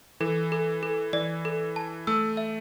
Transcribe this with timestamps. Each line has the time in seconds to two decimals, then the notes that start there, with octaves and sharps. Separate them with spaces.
0.20 E3 A4
0.52 A4
0.83 A4
1.13 E3 D5
1.45 A4
1.76 A5
2.07 A3 E6
2.37 E5